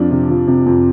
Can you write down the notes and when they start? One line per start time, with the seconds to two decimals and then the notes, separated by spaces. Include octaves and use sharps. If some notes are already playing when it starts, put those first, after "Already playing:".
Already playing: F2 F3 D4
0.11 C3
0.30 F3
0.47 C3
0.66 F2